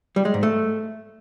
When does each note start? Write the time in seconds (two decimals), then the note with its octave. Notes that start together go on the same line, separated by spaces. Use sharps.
0.16 G3
0.25 G#3
0.34 G#2
0.43 A3